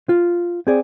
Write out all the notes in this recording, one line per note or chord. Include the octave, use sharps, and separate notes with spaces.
F4
C4 G#4 D5